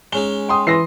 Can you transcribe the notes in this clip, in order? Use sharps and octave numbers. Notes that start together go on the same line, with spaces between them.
G#3 C#4 D#4 G7
G5 C6 D#6
E3 C6 A#6 C7